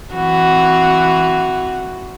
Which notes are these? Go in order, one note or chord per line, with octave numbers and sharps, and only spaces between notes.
E3 C4 F#4